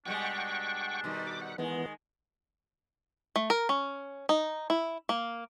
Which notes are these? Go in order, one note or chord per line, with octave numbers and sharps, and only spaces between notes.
B2 G3 G#3 D4 F#5 G5 C#6
B2 D#3 G3
D6
F#5
D#3 E3 G#3 B3
A3
A#4
C#4
D#4
E4
A#3